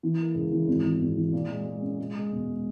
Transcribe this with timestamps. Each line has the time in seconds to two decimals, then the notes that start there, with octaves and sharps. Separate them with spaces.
0.03 E3
0.19 A#3
0.35 C#2
0.52 E3
0.68 G#1
0.85 E3
1.01 G#1
1.17 E3
1.33 A#2
1.49 G#3
1.65 G#3
1.82 C#4
1.99 G#3
2.15 G#3
2.31 E1